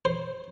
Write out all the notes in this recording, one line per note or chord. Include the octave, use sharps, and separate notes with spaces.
C5